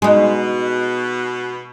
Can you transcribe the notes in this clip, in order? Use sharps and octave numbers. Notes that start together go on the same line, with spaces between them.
B2 G#3 D#4